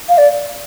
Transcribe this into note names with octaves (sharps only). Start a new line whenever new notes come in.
F5
D5